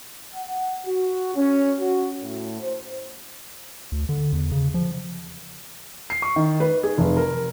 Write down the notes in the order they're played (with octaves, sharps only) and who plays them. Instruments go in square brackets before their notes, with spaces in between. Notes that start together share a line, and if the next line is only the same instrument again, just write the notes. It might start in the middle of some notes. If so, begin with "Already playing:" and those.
[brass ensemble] F#5
F#4
C#4
F#4
A2
C5
[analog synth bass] D2
D3
E2
C#3
F3
[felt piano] C7
C#6
D#3
B4
G#4
F1
A#4